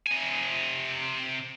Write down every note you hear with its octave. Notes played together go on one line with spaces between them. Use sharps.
C3 G#5